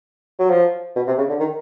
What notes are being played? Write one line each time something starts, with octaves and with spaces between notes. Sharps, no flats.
F#3
F3
B2
C3
C#3
D3
D#3